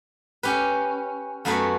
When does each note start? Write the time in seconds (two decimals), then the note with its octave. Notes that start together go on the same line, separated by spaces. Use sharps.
0.43 C#4 G4 B4
1.45 F#2 A3 B3 F#4 B5